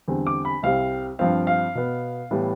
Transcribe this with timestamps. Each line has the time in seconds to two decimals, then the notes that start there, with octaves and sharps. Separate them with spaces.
0.08 E2 D3 G3 C4
0.27 D6
0.45 B5
0.63 C2 C3 G3 C4 F5
1.19 G2 F3 C4 F5
1.47 F5
1.75 B2 B3
2.31 A2 E3 G3 B3